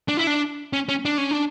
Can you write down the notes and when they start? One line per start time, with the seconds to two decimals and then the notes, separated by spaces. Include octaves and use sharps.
0.08 D4
0.17 E4
0.27 D4
0.73 C#4
0.89 C#4
1.05 D4
1.18 C#4
1.31 D4